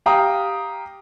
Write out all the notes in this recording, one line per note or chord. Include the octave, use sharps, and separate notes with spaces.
G4 F5 G5 A#5 D#6